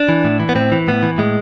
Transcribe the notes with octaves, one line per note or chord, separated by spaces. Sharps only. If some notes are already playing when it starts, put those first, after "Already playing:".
Already playing: D4
E3
A2
E3
B3
A2 C4
E3
A2 B3
E3
A2 G#3